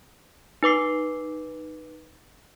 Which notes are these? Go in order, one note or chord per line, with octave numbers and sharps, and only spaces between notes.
D#4 B4 D6 C7